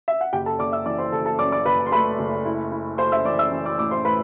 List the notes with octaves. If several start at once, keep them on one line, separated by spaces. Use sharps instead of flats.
E5
F#5
F#1 G4 G5
A4 A5
F#1 D5 D6
E5 E6
E3 D5 D6
C5 C6
F#1 A4 A5
A4 A5
F#2 D5 D6
D5 D6
F#1 B4 B5
C6
A3 B4 B5
F#1
E4
E4
A3 C5 C6
E5 E6
E3 D5 D6
E5 E6
E3
D5 D6
A2 D5 D6
C5 C6
A2 B4 B5